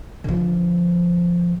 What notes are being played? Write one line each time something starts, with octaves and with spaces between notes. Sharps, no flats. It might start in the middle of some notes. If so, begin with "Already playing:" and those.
D3 F3